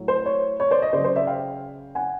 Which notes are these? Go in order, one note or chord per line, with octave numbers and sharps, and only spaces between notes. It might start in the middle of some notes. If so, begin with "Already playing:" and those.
Already playing: A2 F#3
C5
C#5
C#5
C5 D5
D#5
C#3 F#3 C5 D5
C5 D5
D5 E5
F5 G5
F#5 G#5